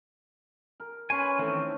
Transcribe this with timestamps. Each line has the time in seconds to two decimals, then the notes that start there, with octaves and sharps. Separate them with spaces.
0.80 A#4
1.10 C#4 B4 G#5 C6 C#6
1.39 D#3 E3 A3 C4